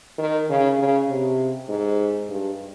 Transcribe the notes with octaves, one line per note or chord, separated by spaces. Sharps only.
D#3
C#3
C#3
C3
G#2
G2